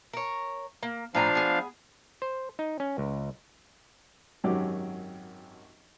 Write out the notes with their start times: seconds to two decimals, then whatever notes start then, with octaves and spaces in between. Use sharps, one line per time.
0.13 A#4 C#5
0.83 A#3
1.15 A2 F3 D4 F5 G#5 A#5
1.35 B3 G#4
2.22 C5
2.59 D#4
2.80 C#4
2.98 C#2
4.44 G#1 F#2 F#3 G4 D6